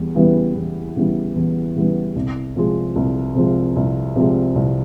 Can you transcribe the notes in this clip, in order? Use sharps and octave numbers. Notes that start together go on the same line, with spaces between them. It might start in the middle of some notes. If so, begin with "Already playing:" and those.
Already playing: E2 G3
C#3 E3 G3 B3
E2
C#3 E3 G3 B3
E2
C#3 E3 G3 B3
C2
C3 F3 G#3
C2
C3 F3 G#3
C2
C3 F3 G#3
C2